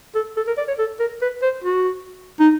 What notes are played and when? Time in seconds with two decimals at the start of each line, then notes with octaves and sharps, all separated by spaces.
0.15 A4
0.37 A4
0.47 A#4
0.58 D5
0.68 C#5
0.78 A4
1.00 A#4
1.21 B4
1.42 C5
1.64 F#4
2.40 D#4